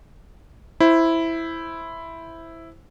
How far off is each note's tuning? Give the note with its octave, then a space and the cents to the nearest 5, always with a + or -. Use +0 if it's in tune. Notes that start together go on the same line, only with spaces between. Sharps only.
E4 +0 C5 +5